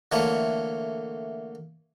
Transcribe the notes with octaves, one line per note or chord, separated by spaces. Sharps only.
D3 E3 A3 A#3 C#5